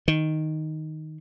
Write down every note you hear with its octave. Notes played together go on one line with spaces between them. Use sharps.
D#3